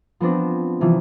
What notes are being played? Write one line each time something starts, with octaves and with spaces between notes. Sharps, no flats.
F3 B3 C4 D4
C3 E3 F3